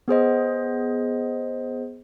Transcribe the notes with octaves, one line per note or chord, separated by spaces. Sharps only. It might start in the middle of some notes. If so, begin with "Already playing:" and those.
B3 G#4 C5 D#5